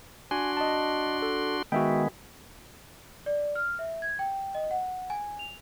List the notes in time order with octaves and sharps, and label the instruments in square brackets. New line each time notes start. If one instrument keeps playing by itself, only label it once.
[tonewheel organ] D4 F#4 C6 [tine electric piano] G#5
[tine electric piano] D#5 A5
A4
[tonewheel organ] D#3 G#3 B3 [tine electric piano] F#4 E5 G5
[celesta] D5
F6
E5
G#6
G5
D#5
F#5
G#5
F7